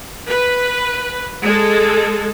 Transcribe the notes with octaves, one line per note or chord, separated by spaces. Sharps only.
B4
G#3 A4